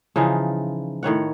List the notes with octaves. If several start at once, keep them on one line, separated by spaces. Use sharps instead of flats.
C#3 E3 F3 D#4
A2 D#3 C#5 F#5